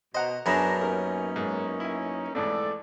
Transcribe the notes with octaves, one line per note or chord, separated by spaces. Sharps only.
B2 C5 D#5 F#5 A#5
F#2 B3 D4 G#4 B4 A#5
A#3 C#4 D#4 G4 A#4
G#2
E4 G#5
F2 G#2 E3 A3 A4 D5